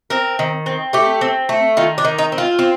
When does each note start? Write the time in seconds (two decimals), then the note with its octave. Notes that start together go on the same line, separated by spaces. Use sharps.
0.10 C4 A#4
0.39 D#3
0.66 C4
0.93 A3 G4
1.21 C4
1.49 A3
1.77 D#3 F4
1.98 D4
2.05 D#3
2.18 D#4
2.32 C4
2.38 F4
2.59 C4